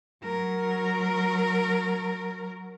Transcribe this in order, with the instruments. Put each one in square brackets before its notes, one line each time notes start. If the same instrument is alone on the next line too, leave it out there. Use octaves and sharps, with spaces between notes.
[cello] F#3 A#4